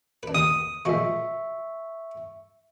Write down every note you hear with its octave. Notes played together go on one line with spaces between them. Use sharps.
D4 B4
D#2 D#6
A#2 F3 G#3 E5 C#6